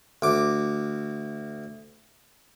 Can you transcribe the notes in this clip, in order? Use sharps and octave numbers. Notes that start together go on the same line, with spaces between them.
D2 D6